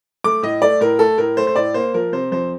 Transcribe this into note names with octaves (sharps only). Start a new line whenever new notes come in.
A3 D6
A2 D#5
A3 D5
A2 A#4
A3 A4
A2 A#4
A3 C5
C5
A2 D5
A#3 C5
F3 A#4
C3 C5
F2 C5